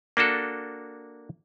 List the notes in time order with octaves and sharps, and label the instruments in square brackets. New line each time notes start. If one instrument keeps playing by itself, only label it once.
[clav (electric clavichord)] A#3 D4 F#4 A4